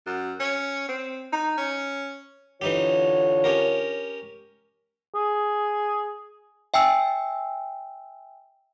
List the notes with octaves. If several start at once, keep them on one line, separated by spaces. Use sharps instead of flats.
F#2
C#4
C4
D#4
C#4
D3 E3 D#4 F4 G4 C#5
C#4 G4 A#4
G#4
E5 G5 G#5 E6